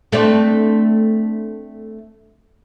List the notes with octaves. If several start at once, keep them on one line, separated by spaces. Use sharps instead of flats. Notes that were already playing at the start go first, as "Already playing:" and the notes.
A3 C4 D4